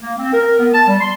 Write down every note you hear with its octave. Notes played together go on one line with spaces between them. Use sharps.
A#3
C4
A#4
B3
A5
G3
C6